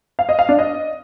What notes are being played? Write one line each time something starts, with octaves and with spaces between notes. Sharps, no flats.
F5
D#5
F5
D4
D#5